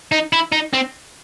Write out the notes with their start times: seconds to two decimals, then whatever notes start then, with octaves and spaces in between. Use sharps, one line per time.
0.12 D#4
0.33 E4
0.52 D#4
0.74 C4